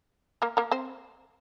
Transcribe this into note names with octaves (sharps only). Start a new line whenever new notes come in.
A#3 A#4
A#3 A#4
C4 C5